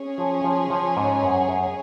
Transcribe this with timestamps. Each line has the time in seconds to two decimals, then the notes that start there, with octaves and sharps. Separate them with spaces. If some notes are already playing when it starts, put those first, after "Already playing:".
Already playing: C#4 G#4 C#5
0.18 F3
0.44 F3
0.70 F3
0.97 G#2
1.23 F#2
1.49 F#2